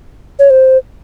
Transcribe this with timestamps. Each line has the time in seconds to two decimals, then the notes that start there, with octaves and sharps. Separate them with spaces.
0.39 C#5
0.50 C5